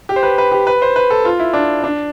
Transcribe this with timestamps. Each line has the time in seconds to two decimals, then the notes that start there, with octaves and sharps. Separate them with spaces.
0.09 G4
0.16 C5
0.23 B4
0.38 B4
0.52 G4
0.67 B4
0.82 C5
0.96 B4
1.10 A4
1.25 F4
1.40 E4
1.53 D4
1.84 D4